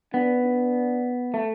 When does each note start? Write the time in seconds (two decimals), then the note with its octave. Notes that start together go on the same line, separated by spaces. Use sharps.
0.14 B3 D4
0.44 D4
1.34 A3